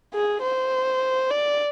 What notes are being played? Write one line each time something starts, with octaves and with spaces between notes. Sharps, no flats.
G#4
C5
D5